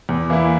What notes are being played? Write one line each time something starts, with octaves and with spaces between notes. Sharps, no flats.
E2
E3 A#3 E4